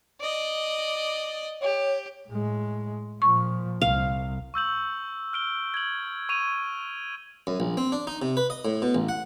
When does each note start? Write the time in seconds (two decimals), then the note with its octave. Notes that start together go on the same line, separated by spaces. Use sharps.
0.20 D5 D#5
1.61 G4 C#5
2.29 A2 G#3
3.22 A#2 F3 C#6
3.81 C2 F5
4.54 C#6 E6 G6 F#7
5.33 F6 D7 G7
5.74 G#6 F#7
6.29 C#6 D#7 F7
7.47 F#2
7.60 A#1
7.77 C4
7.92 D4
8.07 D#4
8.22 C3
8.37 B4
8.50 D#5
8.65 A2
8.82 B2
8.95 A1
9.09 F#5